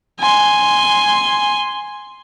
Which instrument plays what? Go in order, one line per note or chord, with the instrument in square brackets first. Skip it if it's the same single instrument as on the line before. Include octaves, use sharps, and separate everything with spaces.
[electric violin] G#5 C6